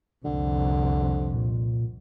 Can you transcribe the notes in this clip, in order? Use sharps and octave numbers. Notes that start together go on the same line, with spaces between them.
C2 F2 D3
A#2